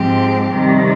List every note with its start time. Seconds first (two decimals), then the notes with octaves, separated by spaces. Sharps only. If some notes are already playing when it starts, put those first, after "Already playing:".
Already playing: G#2 F3 G#3 C4 G4
0.53 C3 D#3 G3 C4